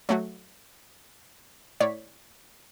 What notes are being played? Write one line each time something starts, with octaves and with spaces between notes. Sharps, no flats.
F#3 A3 F#4
A2 C#5 D5 B6